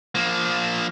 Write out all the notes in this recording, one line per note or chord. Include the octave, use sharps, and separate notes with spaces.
F3 A#3